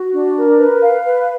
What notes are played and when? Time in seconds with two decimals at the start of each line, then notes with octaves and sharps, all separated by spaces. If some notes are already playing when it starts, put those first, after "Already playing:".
Already playing: F#4
0.13 D4
0.36 A#4
0.59 B4
0.82 F5
1.06 B4